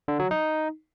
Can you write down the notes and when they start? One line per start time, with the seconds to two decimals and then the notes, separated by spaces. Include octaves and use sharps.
0.08 D3
0.19 F#3
0.31 D#4